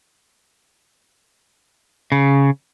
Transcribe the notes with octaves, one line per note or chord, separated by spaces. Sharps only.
C#3